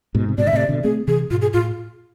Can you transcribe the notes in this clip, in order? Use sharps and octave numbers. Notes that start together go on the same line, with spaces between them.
G#2 B2
C3
G#2 B2 D5
D3 E5
A2 C3 D5
B2 D3
A3 C4 G#4
C3 E3 G#4
G#2 B2 F4
G#4
A2 F4